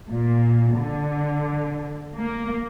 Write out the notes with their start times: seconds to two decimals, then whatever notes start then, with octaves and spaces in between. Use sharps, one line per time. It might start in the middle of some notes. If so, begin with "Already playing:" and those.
0.10 A#2
0.77 D3
2.18 A#3